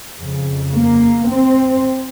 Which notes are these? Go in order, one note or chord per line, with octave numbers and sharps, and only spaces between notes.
F2 C#3
A#3
C4